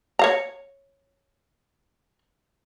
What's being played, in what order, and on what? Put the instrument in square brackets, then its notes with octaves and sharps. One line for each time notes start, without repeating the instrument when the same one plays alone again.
[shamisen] C#5 F5 A#5